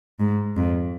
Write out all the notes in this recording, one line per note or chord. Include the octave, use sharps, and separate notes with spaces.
G#2
F2